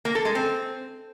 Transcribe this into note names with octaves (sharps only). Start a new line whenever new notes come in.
A#3
A4
G#3
C4